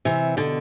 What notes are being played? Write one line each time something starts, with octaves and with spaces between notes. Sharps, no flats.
C3 E3
B2 D3